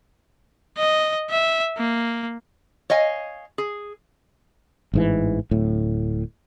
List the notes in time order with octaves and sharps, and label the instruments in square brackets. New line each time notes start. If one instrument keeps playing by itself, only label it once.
[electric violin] D#5
E5
A#3
[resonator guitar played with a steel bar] C#5 D#5 F5 G#5
G#4
[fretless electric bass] A1 G#2 E3
D1 A2